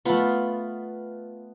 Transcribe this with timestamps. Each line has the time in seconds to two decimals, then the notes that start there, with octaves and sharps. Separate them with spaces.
0.05 A3 B3 F4 B5